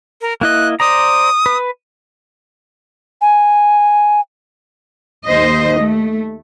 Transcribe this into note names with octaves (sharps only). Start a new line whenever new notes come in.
A#4
A#3 E4 D#5 F#6
C5 D5 A#5 D#6
B4
G#5
D#2 C5 D#5
A3